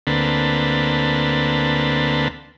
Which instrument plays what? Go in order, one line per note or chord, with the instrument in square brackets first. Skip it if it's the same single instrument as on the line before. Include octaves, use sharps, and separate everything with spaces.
[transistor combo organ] D2 D3 A#3 C4 B4 A5